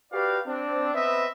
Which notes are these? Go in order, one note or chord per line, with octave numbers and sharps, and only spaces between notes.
F#4 G4 B4 D5 F5
C4 D4
B3 C4 B4 D#5 E5